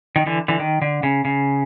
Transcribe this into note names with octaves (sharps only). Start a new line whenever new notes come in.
D#3
D3 E3
D3 E3
D#3
D3
C#3
C#3